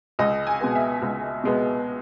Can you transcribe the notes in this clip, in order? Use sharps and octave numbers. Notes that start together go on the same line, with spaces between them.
C#2 D#5
G#5
B2 G#3 B3
E5
C#2
B2 G#3 B3